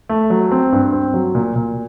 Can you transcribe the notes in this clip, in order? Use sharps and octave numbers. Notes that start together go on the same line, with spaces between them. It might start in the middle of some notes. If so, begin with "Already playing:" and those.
A3
F#3
C4
G2
C4
F#3
A#2
A#2